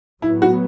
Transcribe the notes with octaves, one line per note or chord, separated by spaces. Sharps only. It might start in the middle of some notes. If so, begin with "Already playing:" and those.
A2 F#3 B3 E4
F#4